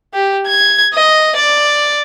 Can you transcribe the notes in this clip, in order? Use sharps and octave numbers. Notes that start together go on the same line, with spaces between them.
G4
G#6
D#5
D5